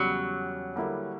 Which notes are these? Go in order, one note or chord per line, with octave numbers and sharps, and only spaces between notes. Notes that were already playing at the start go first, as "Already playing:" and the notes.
Already playing: E2 C#3 F#3 G3
D3 G3 A#3 E4